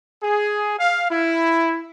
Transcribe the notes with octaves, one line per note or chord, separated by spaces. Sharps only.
G#4
F5
E4